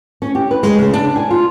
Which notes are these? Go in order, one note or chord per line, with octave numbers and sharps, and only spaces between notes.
C#4
G4
B4
G#3
C#3
D4
G#5
F4